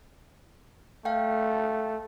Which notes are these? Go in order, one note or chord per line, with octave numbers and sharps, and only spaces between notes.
A3 F5 G5